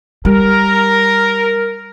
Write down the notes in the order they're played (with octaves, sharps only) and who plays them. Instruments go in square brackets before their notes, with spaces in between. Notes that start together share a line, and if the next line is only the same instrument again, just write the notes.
[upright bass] G3 [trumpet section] A#4